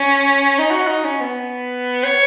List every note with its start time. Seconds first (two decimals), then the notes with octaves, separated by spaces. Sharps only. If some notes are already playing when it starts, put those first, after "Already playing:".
Already playing: C#4
0.58 D#4
0.71 F#4
0.87 D#4
1.04 C#4
1.21 B3
2.04 C#5